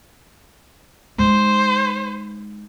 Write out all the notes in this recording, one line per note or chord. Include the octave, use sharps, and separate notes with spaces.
G#3 D#4 C5